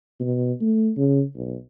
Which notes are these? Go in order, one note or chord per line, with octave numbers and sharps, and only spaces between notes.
B2
A3
C#3
B1